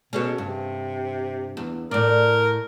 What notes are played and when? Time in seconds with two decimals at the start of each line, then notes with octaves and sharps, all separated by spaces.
0.13 B2 C#4 G#4 A4
0.38 G2 C3
1.57 E2
1.91 A2 A#4 D5